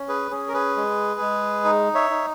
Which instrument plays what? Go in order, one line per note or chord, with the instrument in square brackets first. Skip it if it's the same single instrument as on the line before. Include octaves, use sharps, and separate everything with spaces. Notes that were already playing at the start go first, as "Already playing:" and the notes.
Already playing: [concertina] C#4
G#4 B4
C#4 G#4
A#4
G#4 B4
G#3
G#3
D#4
C#5 E5
D#4